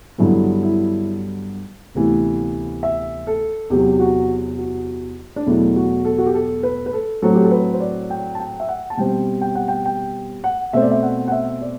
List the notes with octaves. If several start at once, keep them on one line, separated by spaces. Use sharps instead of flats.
G2 D3 F#3 B3 E4
E4
D2 C3 E3 B3
E5
A4
E2 C3 F#3 G4
F#4
F#4
D4
E2 B2 F#3 A3 E4
F#4
A4
F#4
G4
A4
B4
B4
A4
A2 F#3 C4 A4
G4
A4
B4
C5
D5
G5
A5
G5
E5
F#5
A5
B2 G3 C4 G5
G5
F#5
G5
G5
F#5
B2 A3 C4 E5
D5
E5
F#5
F#5
E5
D5